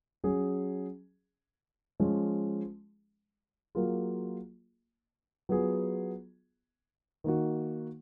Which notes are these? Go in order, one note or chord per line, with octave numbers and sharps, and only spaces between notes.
F#3 C#4 G#4
F3 G#3 C#4 G#4
F#3 A#3 F4 G#4
F#3 B3 F4 G#4
D#3 A#3 D#4 F#4